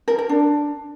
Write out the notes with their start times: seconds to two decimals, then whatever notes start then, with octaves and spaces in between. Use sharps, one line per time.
0.08 A#4
0.18 A#4
0.29 D4